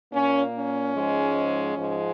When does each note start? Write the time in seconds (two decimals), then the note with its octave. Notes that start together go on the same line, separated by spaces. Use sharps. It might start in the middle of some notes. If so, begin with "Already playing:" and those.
0.13 A#2 A#3 C#4
0.54 C#4
0.95 G#2 F3 G#3
1.77 G#2 F3 G#3